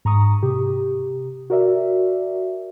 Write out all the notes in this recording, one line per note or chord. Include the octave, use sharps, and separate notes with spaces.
G#2 A#5 C#6 D#6
C3 G4
F#4 A#4 D5 E5